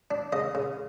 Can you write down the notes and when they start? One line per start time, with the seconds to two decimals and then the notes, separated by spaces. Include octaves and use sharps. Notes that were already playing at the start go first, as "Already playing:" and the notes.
0.11 D4
0.32 C#3 D#5
0.55 C#3